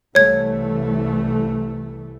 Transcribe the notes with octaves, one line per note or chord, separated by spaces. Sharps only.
C2 E3 A3 C#5 G#6